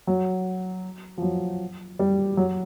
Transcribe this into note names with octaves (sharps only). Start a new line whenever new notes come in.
F#3
F3
F#3
G3
F#3